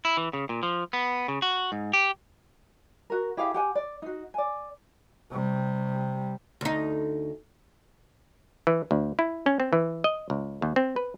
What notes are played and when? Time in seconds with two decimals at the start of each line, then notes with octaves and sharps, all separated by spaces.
0.05 E4
0.17 E3
0.33 C#3
0.49 A#2
0.63 F3
0.93 B3
1.28 C#3
1.42 F#4
1.72 G#2
1.93 G4
3.10 F#4 A#4
3.37 E4 G4 G#4 F5
3.54 G4 F#5 G#5
3.75 D5
4.02 D#4 F#4
4.34 D5 G#5
5.30 C3 G3
6.61 D2 D#4
8.67 E3
8.91 D2
9.19 E4
9.46 C#4
9.60 C4
9.73 E3
10.04 D#5
10.30 C#2
10.62 D#2
10.76 C4
10.96 B4